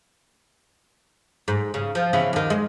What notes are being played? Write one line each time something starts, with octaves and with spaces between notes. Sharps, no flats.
G#2
C#3
F3
C#3 E3 B3
D#2 D#3
G#3